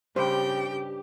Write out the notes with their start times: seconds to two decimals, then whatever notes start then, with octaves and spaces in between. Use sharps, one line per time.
0.16 G2 C#3 G3 D4 G4 C5 G5